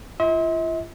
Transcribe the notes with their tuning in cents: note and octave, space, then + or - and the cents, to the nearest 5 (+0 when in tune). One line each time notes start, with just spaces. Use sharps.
F4 -35 E5 -45 C6 +0